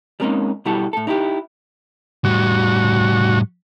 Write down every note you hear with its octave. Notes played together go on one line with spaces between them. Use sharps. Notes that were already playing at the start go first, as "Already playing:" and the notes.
G3 G#3 A#3 C4 C#4 D#4
B2 G3 E4 F#4 G4 A4
A2 A4
D#4 E4 F#4 G4
A2 G3 F#4